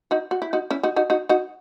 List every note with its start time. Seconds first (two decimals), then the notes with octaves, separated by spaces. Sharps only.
0.11 D#4 F#4
0.31 F#4
0.42 E4
0.53 D#4 F#4
0.70 C#4 E4
0.83 D#4 F#4
0.96 D#4 F#4
1.10 D#4 F#4
1.29 D#4 F#4